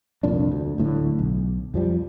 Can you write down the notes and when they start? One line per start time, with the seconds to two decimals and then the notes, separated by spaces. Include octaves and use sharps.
0.23 C2 F2 A#2 D4
0.52 D2
0.78 D1 A2 D3
1.19 B1
1.74 F2 F3 G3